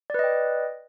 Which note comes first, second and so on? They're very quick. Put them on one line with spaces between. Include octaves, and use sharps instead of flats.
D5 B4 D#5 G5